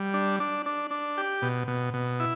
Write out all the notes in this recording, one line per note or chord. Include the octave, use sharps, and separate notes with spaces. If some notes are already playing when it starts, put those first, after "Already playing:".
Already playing: G3
D4
D4
D4
D4
G4
B2
B2
B2
E4